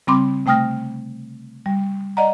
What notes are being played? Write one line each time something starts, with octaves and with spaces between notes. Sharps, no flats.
C#3 G3 C4 B5 C6 D6
C3 A3 G5 D#6 F6 A#6
G3
D5 D#5 F#5 A#5